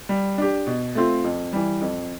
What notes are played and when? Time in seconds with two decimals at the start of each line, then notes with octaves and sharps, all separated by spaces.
0.09 G3
0.38 D4 G4
0.67 B2
0.95 A3 C4 F4
1.24 F2
1.53 E3 G3
1.81 F2